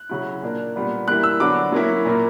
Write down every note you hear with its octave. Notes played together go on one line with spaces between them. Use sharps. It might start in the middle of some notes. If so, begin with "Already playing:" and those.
Already playing: F#6
C#3 F#3 C#4 E4
A#2 A#3 D4
A#2 G3 B3 D4
E3 G3 A#3 E4 F#6
E6
D3 F#3 B3 D4 D6
F#3 A#3 C#4 E4
A#2 A#3 E4